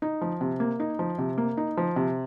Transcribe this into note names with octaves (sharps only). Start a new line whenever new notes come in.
D#4
F3
C3
A#3
D#4
F3
C3
A#3
D#4
F3
C3